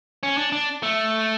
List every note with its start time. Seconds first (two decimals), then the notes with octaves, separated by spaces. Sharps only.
0.23 C#4
0.38 D4
0.52 D4
0.83 A3